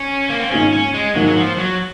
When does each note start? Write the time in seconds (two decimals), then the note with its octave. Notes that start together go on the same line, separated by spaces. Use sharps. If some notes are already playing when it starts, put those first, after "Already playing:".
Already playing: C#4
0.30 A#3
0.40 C4
0.51 G#2 D#3 A#3 C#4 F4 G#4
0.73 C#4
0.94 G#3
1.15 G#2 D#3 F#3 A#3 F4 G#4
1.26 F#3
1.37 F3
1.58 F#3